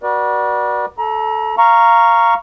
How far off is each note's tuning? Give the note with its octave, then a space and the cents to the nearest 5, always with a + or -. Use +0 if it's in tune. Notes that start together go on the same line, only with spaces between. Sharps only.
F#4 +15 B4 -40 D5 +15
A4 -10 A#5 +30
F5 -15 A#5 +0 C#6 +0